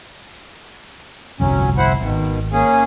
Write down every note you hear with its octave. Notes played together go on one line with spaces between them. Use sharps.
G1 C2 F2 F#3 C#4
E4 C5 F#5
G#1 B2 D#3
A#3 C#4 G#4